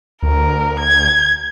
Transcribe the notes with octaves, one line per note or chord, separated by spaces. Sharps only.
D2 A#4
G#6